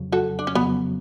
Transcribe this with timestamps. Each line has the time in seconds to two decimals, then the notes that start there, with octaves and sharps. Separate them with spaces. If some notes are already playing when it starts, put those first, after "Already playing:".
Already playing: F2 C#3 F#3
0.12 F#4 A4
0.39 D4
0.47 C#4
0.55 F2 C#3 F#3 B3